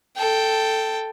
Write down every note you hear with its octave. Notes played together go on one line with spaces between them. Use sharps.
A4 G5